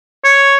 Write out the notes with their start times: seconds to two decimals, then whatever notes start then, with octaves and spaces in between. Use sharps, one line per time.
0.24 C#5